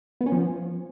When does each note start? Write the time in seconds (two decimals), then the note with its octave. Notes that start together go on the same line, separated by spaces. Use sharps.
0.21 B3
0.26 C#4
0.32 F3